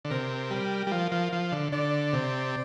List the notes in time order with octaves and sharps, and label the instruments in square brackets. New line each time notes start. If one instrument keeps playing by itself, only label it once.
[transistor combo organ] D3
[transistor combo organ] C3 [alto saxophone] A#4
[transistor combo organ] G3
G3
F3
F3
F3
D3
[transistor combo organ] D3 [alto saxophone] D5
[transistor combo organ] C3